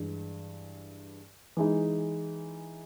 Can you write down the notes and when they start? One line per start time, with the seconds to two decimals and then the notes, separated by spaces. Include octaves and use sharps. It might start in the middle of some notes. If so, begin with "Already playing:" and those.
Already playing: G2 E3 G#3
1.57 E3 G#3 D#4